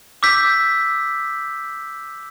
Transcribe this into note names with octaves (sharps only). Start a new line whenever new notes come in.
D6 E6 G6 B6